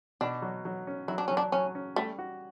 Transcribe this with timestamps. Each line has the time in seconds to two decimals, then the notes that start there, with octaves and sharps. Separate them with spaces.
0.21 B2 D4
0.42 F#3
0.65 F#3
0.87 C#4
1.08 F#3 E4
1.18 D4
1.28 F#3 C#4
1.37 D4
1.52 F#3 C#4
1.75 C#4
1.96 G3 A3
2.19 F#4